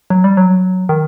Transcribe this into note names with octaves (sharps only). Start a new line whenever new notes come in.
F#3
G3
F#3
D#3